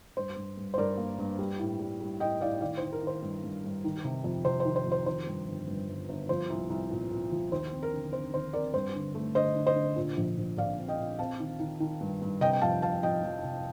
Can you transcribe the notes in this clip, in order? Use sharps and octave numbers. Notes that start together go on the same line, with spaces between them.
G2 C5
G2
G2
C5
G2 A#4 D5
A#3
G2
G3
A2
G3
G3
A2 D#5 G5
A2 D5 F5
D#3 D5 F5
C5
D#3
A#4
D#3 C5
G2
G2
G2
D#3
C3
F2
C3 C5
C5
D#3
C5
F2
C5
D#3 C5
G2
G1
G2
G1
G1
F3 C5
C2
C2
A#2
A#2
F3
D#2 C5
C4
A#4
D3
C4 C5
D#2 C5
C4 A#4 D5
G2 C5
D3
A3
D3 C5 D#5
D3
C5 D#5
D3
A#2
A#1
A#1
A#1 D5 F5
C4
D#5 G5
A#2
C4 F5 A5
D#3
D#3
D#3
G2
G2
C3 D#5 G5
G5
F2 F5 A5
C3 F5 A5
F2 D#5 G5
F2
C3